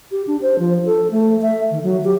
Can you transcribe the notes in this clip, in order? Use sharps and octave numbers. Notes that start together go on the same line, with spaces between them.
G4
D4
C5
F3
A4
A3
E5
D#3
F#3
G4